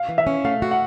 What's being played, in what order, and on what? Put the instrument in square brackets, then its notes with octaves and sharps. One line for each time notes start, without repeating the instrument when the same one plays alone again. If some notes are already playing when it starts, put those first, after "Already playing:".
Already playing: [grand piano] F5
[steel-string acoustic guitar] E3
[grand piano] E5
[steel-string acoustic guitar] C#4
[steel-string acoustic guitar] A3 [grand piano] F5
[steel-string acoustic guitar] F#4
[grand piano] F#5